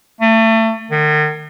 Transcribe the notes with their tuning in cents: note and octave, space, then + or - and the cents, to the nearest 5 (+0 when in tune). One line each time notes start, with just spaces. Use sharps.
A3 +30
D#3 -40